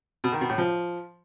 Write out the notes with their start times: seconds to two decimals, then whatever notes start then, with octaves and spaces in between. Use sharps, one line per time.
0.24 B2
0.32 D#3
0.41 B2
0.50 A2
0.58 F3